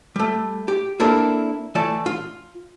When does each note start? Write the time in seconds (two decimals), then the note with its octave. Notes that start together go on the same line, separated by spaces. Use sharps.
0.16 G3 A3
0.68 G4
1.00 A#3 C4 D4 E4 A4 A#4
1.75 E3 A3 D5 A5
2.06 F4